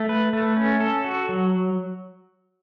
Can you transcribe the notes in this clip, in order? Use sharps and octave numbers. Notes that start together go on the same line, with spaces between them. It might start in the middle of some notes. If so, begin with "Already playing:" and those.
Already playing: A3
B4
A3
C#4
A4
F#4
F#3